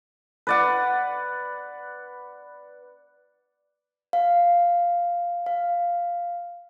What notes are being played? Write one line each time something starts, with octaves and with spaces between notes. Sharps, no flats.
B4 D5 F#5
F5
F5